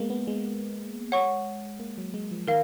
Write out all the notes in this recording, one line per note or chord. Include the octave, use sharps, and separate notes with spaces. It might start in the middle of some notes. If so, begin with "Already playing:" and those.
Already playing: G#3 A#3 B3
B3
G#3
C#5 F#5 C#6
A#3
F#3
G#3
F3
D#3 A#4 F5